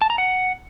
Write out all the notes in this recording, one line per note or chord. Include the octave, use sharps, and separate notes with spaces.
A5
A#5
F#5